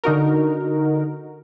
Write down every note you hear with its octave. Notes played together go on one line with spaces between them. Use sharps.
D3 D#4 F#4 A#4